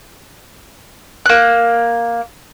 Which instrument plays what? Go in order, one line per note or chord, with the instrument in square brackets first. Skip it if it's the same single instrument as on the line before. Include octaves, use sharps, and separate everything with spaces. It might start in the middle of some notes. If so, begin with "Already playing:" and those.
[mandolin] A#3 F#6